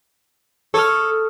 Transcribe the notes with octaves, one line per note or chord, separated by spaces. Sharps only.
A4 C#5 D#6 F6